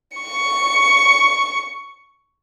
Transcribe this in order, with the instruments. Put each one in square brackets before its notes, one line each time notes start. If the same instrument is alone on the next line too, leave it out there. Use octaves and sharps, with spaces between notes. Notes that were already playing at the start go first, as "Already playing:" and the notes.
[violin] C#6 C#7